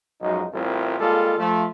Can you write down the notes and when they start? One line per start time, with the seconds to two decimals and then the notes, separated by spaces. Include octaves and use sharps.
0.21 B1 F#2 F3 G#3 D#4
0.53 A1 G3 C4 E4 F4 A#4
0.99 G3 G#3 A#3 F4 A4
1.38 F3 A3